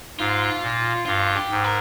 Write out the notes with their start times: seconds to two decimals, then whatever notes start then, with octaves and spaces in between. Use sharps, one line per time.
0.19 G#2 F4
0.62 A#2
1.06 G2 F4
1.35 G4
1.50 G#2
1.64 A#4